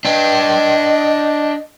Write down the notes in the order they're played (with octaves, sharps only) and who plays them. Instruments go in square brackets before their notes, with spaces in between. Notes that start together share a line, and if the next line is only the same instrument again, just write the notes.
[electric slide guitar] D4 G5 [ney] D#5